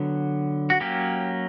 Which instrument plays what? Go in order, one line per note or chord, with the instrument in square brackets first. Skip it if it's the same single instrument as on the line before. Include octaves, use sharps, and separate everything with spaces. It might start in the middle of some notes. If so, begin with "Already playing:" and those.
Already playing: [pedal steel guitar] D3 F#3 B3
F#4
F#3 A#3 C#4 G4